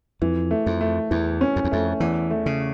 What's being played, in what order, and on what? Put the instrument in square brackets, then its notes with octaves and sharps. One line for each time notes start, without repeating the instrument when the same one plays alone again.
[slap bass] F2 [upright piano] E3
[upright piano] A3
[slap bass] F2
[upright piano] A3
[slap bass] E2 [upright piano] E3
[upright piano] C#4
[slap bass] F2
E2
[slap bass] F2 [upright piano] A3
[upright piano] E2 [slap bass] E3
[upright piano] A3
[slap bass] C#3